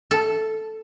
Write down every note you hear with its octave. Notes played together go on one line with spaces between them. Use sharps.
A4